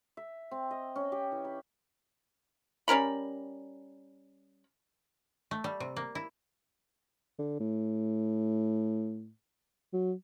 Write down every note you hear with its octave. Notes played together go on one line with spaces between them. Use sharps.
E5
C4
D#5
C#4
G4
E3
B5
G3 C#4 A#4 B5
A3
G3
C3
A#3
E4
D3
A2
F#3